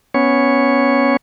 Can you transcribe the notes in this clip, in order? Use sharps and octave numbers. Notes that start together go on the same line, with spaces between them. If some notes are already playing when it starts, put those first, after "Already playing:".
B3 C#4 C#5